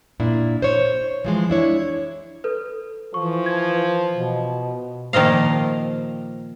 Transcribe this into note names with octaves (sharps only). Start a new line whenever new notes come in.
A#2 D4 E4
C5 C#5
E3 F3 G#3
D4 E4 C#5
A4 B4
E3 F3 C#6
G#6
B2
A#2 D#3 F3 D#5 F5